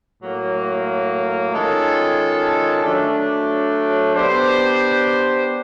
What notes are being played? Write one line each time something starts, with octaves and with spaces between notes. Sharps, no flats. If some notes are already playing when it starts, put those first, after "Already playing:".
A2 F#3 A#3
D#3 G#3 C#4 F4 A4
F#3 A3 D4
B3 D4 G4 C5